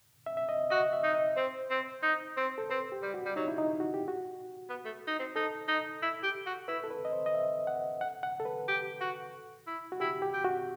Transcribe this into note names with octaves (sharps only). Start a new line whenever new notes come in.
E5
E5
D#5
F#4 D#5
E5
D#4
D#5
C4 C5
C4
D#4
C4
A4
C4 B4
G4
G3
F#4
G3
F#3 D#4
E4
D#4
F#4
G4
F#4
B3
A3
D#4
C4
D#4 A4
D#4
E4
G4
F#4
E4 B4
A4
B4
D#5
C5
D#5
E5
F#5
F#5
F#5
A4
B4
G4
F#4
E4
F#4
E4 G4
G4
G4
F#4